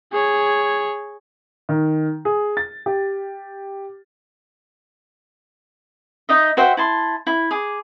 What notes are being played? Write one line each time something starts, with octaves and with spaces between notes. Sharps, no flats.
G#4 C#5
D#3
G#4
A6
G4
D#4 D#5 E5
F#4 C5 E5 G5
E4 A5 C6
E4
G#4 D6